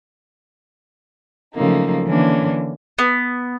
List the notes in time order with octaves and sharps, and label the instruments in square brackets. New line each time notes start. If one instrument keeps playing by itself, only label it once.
[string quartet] C#3 F3 F#3 A3 A#3 D#4
D3 E3 A#3 C#4 D4
[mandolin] B3